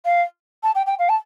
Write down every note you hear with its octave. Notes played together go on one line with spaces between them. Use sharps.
F5
A5
G5
G5
F5
A5